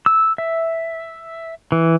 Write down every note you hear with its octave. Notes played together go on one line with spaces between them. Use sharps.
E6
E5
E3